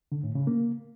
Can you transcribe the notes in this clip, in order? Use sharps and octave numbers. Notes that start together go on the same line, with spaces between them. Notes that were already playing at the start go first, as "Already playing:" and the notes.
D3
A2
C#3
A#3